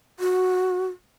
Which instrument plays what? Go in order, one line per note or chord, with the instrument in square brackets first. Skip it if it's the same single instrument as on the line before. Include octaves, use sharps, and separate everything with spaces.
[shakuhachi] F#4